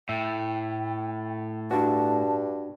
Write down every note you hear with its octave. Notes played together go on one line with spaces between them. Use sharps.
A2 E5 G5
G2 D4 F#4 A5